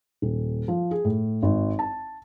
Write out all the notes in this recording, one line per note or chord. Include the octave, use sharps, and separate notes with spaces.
D#1
F3
G#4
A2
G#1
A5